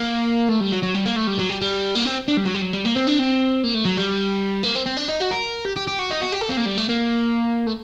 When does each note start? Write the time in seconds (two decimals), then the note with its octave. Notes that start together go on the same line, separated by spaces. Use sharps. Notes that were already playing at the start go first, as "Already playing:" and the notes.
Already playing: A#3
0.49 A3
0.60 G3
0.72 F#3
0.83 F#3
0.94 G3
1.06 A#3
1.16 A3
1.27 G3
1.39 F#3
1.49 G3
1.61 G3
1.95 A#3
2.05 C4
2.28 D4
2.37 G3
2.45 F#3
2.54 G3
2.62 F#3
2.73 G3
2.85 A#3
2.95 C4
3.07 D4
3.19 C4
3.64 A#3
3.75 A3
3.85 F#3
3.97 G3
4.64 A#3
4.76 C4
4.86 C4
4.97 D4
5.08 D#4
5.21 F#4
5.32 A#4
5.65 G4
5.76 G4
5.87 G4
5.99 F#4
6.11 D#4
6.21 F#4
6.32 G4
6.41 A4
6.49 C4
6.57 A#3
6.66 G3
6.78 A3
6.89 A#3
7.67 A3